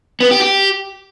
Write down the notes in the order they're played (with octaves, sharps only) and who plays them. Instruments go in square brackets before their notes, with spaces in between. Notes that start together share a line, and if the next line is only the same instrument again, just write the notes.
[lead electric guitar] B3
G4
G4